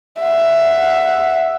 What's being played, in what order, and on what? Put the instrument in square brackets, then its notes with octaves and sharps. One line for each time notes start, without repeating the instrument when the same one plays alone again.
[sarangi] E5 [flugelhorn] F#5